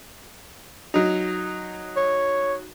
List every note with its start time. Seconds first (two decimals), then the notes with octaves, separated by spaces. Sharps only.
0.94 F#3 D#4
1.96 C#5